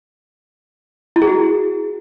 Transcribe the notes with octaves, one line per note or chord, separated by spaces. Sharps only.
E4
G#4
F#4